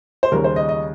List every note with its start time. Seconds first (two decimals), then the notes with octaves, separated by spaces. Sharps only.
0.23 C5
0.31 D#2 C#3 G3 A#4
0.44 C5
0.56 D#5
0.69 D#5